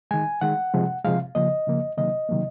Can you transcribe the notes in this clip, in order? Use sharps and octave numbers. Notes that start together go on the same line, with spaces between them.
D#3 G#3 G#5
D#3 G#3 F#5
C3 F3 G#3
C3 F3 G#3 F5
C#3 F3 A#3 D#5
C#3 F3 A#3
C3 D#3 F#3 A#3 D#5
C3 D#3 F#3 A#3